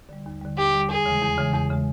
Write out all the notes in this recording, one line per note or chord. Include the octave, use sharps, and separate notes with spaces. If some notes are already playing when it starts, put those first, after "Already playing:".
D3 G3
D#2
D3 G3
D#2 G4
D3 G3
E2 G#4
C#3 E3 G#3
E2
C#3 E3 G#3
E2
C#3 E3 G#3